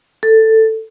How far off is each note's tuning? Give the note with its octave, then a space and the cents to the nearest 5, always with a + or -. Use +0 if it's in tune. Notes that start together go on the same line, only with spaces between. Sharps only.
A4 +10